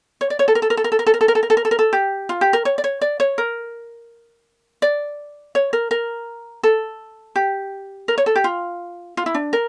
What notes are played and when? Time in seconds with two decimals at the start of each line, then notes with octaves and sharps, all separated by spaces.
0.21 C#5
0.30 D5
0.39 C#5
0.48 A4
0.55 A#4
0.62 A4
0.70 A#4
0.77 A4
0.84 A#4
0.92 A4
0.99 A#4
1.07 A4
1.14 A#4
1.21 A4
1.28 A#4
1.35 A4
1.43 A#4
1.50 A4
1.57 A#4
1.65 A4
1.71 A#4
1.79 A4
1.93 G4
2.29 F4
2.41 G4
2.53 A#4
2.65 C#5
2.78 D5
2.84 C#5
3.01 D5
3.20 C#5
3.38 A#4
4.82 D5
5.55 C#5
5.73 A#4
5.91 A#4
6.63 A4
7.36 G4
8.08 A#4
8.18 C#5
8.26 A4
8.36 G4
8.44 F4
9.17 F4
9.26 E4
9.35 D4
9.53 A#4